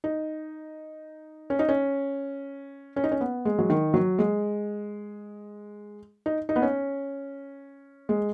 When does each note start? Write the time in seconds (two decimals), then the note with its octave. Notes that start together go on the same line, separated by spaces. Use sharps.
0.04 D#4
1.50 C#4
1.59 D#4
1.69 C#4
2.96 C#4
3.04 D#4
3.11 C#4
3.21 B3
3.45 G#3
3.59 F#3
3.70 D#3
3.94 F#3
4.19 G#3
6.26 D#4
6.49 D#4
6.56 B3
6.62 C#4
8.09 G#3